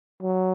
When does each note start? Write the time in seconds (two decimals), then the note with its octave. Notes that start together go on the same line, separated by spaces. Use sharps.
0.23 F#3